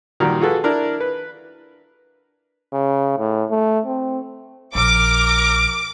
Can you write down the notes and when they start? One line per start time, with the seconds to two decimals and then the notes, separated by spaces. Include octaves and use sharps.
0.20 A#2 D#3 F3 G3 A#3 F#4
0.40 F4 F#4 G#4 A4 B4
0.64 D4 E4 A#4
1.00 B4
2.73 C#3
3.18 A2
3.51 A3
3.86 C4
4.75 A#1 A#4 D6